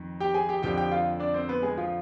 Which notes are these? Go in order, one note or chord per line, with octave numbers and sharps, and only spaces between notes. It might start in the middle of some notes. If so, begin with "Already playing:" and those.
Already playing: F2 D#3
G4 G5
G#4 G#5
G4 G5
F2 D3 F3 G4 G5
G4 G5
F4 F5
D4 D5
C4 C5
B3 B4
G#3 G#4
F3 F4